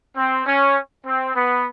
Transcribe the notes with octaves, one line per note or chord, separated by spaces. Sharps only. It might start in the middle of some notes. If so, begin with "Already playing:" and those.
C4
C#4
C4
B3